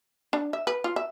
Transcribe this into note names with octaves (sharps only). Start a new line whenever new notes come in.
D4
E5
B4
F4
E5